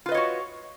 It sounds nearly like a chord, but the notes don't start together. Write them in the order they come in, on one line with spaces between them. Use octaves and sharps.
F4 B4 D#5 C#5 F#4